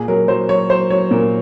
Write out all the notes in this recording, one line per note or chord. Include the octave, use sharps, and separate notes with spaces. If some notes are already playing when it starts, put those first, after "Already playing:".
Already playing: A#2 G#4
F#3 A#4
F#3 C5
F#3 C#5
F#3 C5
F#3 C#5
A#2 A#4